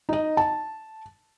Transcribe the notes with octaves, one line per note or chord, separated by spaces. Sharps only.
D#4 D#5
A5